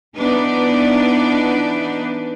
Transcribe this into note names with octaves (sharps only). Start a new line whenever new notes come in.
E3 B3 D4 D#4 B4 D5